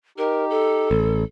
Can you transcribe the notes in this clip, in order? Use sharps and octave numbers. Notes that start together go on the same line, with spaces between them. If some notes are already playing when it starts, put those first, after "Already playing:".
D#4 G4 A#4
A4
A1